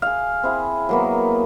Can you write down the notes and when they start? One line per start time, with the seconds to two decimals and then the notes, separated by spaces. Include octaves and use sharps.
0.02 G#4 F5
0.43 C4 E4 G#4
0.89 F#3 A#3 B3